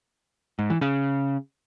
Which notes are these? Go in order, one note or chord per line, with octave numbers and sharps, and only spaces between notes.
G#2
E3
C#3